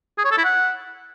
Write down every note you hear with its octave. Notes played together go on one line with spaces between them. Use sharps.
G#4
C#5
A4
E4
F#5